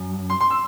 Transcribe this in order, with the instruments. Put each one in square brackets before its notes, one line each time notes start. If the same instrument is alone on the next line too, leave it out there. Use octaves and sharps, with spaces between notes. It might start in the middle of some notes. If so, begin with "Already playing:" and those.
Already playing: [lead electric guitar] F#2
[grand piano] C6
C6
E6